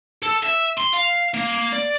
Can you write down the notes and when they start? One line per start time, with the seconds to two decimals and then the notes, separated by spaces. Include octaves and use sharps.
0.23 A4
0.43 E5
0.78 C6
0.94 F5
1.34 A#3
1.73 D5